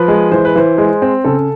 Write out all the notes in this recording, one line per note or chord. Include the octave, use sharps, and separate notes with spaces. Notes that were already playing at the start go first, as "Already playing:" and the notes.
Already playing: F3 B4
G#3
E3 C5
B4
E3 C5
G#3
C4
C#3 A4